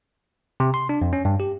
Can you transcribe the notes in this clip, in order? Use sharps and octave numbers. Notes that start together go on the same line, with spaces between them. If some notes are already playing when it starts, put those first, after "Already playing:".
C3
C6
D4
F2
C#4
G2
G4